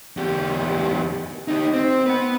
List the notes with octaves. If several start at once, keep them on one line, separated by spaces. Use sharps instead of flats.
E2 G4
D#4 G4
C4
B3 B4